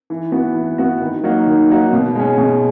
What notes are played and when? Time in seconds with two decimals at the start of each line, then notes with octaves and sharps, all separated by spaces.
0.10 E3
0.32 B3 F#4
0.55 E3
0.78 B3 F#4
1.00 D#3
1.24 F#3 A#3 D#4 F#4
1.46 D#3
1.70 F#3 A#3 D#4 F#4
1.93 B2
2.16 G#3 C#4
2.37 B2